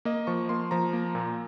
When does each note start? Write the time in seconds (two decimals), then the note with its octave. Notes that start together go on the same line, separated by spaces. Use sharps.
0.05 A#3 D#5
0.27 F3 C#6
0.49 A#3 C6
0.71 F3 A#5
0.93 A#3
1.15 A#2